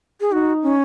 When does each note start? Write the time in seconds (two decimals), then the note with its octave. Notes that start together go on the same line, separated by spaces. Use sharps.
0.21 G#4
0.32 D#4 F#4
0.63 C#4